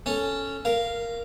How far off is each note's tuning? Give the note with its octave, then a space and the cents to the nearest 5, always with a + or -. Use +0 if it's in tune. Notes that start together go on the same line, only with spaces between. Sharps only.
C#4 +0 A4 +0
A#4 +0 F5 -10